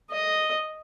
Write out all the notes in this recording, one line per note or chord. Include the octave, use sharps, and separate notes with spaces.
D#5